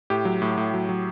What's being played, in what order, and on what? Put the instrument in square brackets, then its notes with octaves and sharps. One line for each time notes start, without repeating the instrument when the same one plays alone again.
[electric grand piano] A2 G4
F#3
A2
A2
F#3
F#3